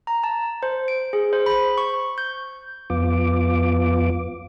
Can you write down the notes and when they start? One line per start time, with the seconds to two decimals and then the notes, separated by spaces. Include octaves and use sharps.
0.07 A#5
0.24 A5
0.63 C5
0.88 D7
1.13 G#4
1.33 C5
1.46 B5
1.78 C#6
2.18 G6
2.90 F2 B3 F4 D6